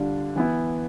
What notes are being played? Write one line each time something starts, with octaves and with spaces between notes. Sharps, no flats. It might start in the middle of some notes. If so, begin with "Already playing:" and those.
Already playing: D3 G3 D4 F4
E3 B3 E4